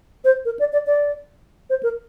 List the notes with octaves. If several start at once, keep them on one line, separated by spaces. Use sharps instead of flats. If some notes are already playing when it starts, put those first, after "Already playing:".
C5
A#4
D5
D5
D5
C5
A#4